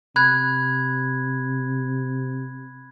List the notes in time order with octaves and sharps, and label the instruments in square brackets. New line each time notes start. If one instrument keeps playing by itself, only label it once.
[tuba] C3 [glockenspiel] B5 F#6 G#6